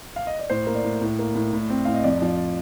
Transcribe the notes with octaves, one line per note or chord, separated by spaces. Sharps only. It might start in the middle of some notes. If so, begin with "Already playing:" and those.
F5
D#5
D5
A2 C5
A#3
D5
A2
A2
A#3
A2
A2
C4
A2 F5
D#5
F2 D5
F3